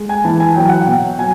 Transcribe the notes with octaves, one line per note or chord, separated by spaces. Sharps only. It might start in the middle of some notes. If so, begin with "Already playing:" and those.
Already playing: G#3
G#5
E3 A5
G#5
F#3 G5
F#5
B2 G5
F#3 G#5